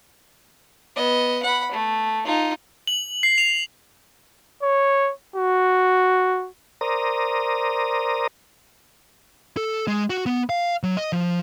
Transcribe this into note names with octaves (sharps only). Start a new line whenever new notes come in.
B3 D#5
F#5 B5
A3
D#4 F4
F#7
C7
F7
C#5
F#4
A#4 C5 D5 A#5 D#6
A4
G#3
F#4
B3
F5
F#3
D#5
F3